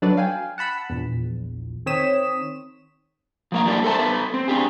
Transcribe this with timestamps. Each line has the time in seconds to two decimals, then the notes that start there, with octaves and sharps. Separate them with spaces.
0.02 F#3 D4 F#4 A4 B4 D5
0.17 F5 G5 G#5
0.58 F#5 A5 B5 E6
0.90 A#1 E2
1.86 D#3 C4 C#5 D#6 B6 E7
3.52 F3 A#3 F5
3.65 E3 G3 A#3 B3 D4
3.84 A4 A#4 C5 E5 G#5 A5
3.99 B3 A4 B4
4.34 C4
4.48 D4 G4 G#4